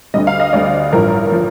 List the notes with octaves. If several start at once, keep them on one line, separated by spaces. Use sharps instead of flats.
D2 D3 G3 D#5
F5
D#5
D2 D3 G3 D5
A1 G2 F3 A#4
F3